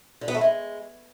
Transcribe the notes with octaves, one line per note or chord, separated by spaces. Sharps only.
D3
B3
A3
G#3